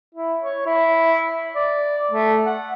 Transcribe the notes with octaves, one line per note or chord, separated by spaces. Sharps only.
E4
C#5
E4
D5
A3
F#5